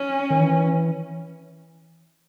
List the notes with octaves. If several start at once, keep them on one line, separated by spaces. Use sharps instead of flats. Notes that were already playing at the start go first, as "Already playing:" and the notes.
Already playing: C#4
D#3
E3